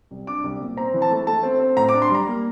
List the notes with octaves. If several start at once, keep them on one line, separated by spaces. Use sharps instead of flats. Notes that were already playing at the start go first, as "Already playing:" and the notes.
C2
D4 D6
C2
A#2
C4 A#5
E3
A5
A3
A3 A5
C4
C4
A2 A#5
D6
D4
C6
G3
A#5
A#3